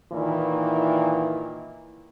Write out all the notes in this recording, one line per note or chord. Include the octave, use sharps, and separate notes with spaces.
A#2 D#3 E3 E4